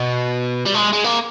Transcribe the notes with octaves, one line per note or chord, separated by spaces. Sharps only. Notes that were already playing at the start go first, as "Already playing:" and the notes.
Already playing: B2
G3
G#3
G#3
A#3